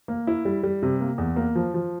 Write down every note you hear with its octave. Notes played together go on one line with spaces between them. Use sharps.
A#3
E4
G3
G3
C3
A#3
E2
A#3
F3
F3